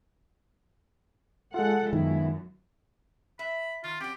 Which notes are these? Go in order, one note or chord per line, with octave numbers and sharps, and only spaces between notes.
G#3 F4 A4 F#5
F#2 D#3 B3 E4
E5 B5
D#3 F4
F#3 C4 G4